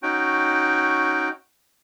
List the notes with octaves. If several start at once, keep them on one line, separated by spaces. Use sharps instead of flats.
C#4 D#4 F#4 G5